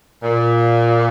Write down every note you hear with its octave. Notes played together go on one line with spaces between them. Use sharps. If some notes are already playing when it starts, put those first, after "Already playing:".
A#2